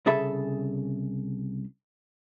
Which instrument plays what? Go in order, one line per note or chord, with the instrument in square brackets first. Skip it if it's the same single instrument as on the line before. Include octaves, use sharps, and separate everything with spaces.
[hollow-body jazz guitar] C2 C#3 G#4 A4 E5 B5